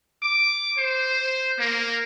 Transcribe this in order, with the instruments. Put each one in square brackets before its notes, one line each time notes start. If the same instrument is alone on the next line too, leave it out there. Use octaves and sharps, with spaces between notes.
[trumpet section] D6
C5
A#3